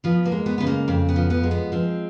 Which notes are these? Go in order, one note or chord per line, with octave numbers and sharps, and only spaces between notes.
F3 B3
A#3
G#3
B3
C#3 B3
A#3
F2 C4
B3
F3
B3
G#3
B3
F3 C4